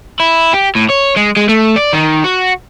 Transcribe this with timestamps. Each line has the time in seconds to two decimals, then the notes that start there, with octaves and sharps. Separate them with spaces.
0.20 E4
0.54 G4
0.76 A2
0.90 C#5
1.17 G#3
1.37 G#3
1.49 A3
1.76 D5
1.93 D#3
2.24 F#4